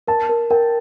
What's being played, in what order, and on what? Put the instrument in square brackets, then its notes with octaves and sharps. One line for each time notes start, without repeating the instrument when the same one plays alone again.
[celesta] A#4 [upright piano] A5
[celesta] A#4
[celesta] A#4 [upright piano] G5